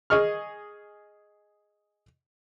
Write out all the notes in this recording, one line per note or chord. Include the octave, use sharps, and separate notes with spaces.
G#4 D#5 C#6 F6